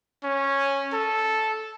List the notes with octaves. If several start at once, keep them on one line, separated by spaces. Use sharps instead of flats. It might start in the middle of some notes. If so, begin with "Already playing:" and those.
C#4
A4